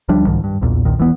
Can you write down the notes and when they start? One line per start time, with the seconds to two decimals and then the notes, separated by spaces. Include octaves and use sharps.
0.09 D2 F3 G3 D4
0.26 C2 G#2 D#3 F3
0.44 G2
0.61 B1 E2 A#2
0.85 E1 B1 A#2 D#3
0.98 D#1 E3 F3 B3